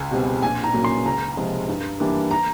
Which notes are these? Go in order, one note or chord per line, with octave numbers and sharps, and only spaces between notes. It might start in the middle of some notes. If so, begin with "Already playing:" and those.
Already playing: C#2 G#5
B2 G3 C4
A#1 G#5
A#5
A#2 F#3 A#3 C#4
C6
C#2 A#5
C3 F3 G#3
G2
E3 G3 A#3 D4
A#5